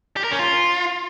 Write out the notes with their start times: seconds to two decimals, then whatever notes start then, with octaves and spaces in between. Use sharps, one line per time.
0.16 G4
0.24 A#4
0.32 C#4
0.39 F4